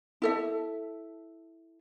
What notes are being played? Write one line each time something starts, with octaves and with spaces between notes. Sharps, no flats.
E4 A4 E5